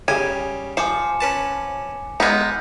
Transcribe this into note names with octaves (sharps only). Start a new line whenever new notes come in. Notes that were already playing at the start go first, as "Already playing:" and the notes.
C#3 G3 G#5
F3 C5 G#5 D6 C#7
C#4 B4 A5
G#3 B3 D#4 F6 G6